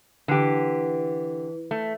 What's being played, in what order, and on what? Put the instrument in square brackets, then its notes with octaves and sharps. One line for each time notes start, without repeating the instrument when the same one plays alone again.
[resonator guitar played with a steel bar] D3 G4 [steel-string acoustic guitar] E3
[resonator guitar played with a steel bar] A3